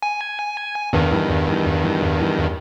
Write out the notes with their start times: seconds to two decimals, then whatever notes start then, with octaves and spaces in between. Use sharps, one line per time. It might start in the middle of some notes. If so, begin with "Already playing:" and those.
0.02 G#5
0.93 E2 G2 D#3